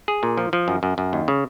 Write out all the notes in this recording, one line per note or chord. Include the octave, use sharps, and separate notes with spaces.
G#4
A#2
F3
F3
F#2
F#2
F#2
D#2
C#3